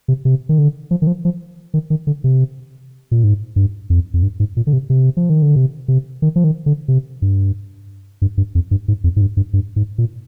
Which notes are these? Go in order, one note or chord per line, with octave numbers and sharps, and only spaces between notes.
C3
C3
D#3
D3
F3
D#3
F3
F3
D#3
D#3
D3
C3
A#2
G#2
G2
F2
F2
G2
G#2
A#2
D3
C3
C3
F3
D#3
D3
C3
C3
D#3
F3
D#3
D3
C3
G2
G2
G2
F2
G2
G#2
F2
G#2
G2
G2
G2
G#2
A#2